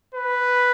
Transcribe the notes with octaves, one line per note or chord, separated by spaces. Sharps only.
B4